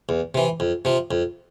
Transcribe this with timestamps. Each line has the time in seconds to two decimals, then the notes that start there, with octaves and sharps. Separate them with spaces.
0.09 E2
0.35 C3 E3
0.60 F2
0.85 C3 F3
1.11 F2